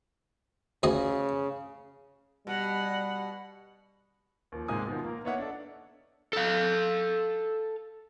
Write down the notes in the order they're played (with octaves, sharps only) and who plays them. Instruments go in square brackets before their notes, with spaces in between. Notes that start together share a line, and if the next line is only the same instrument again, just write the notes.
[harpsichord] D2 G#4 D#5 [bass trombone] C#3
[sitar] B2 [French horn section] G3 [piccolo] F#5
[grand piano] D#2 F3
G#2 C3 G#3 A#3 G#5 D#6
B2 D#3 F3
A#3 A#4
A#3 B3 D#4 C#5 E5 F#5
D4 A4
[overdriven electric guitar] A4 F5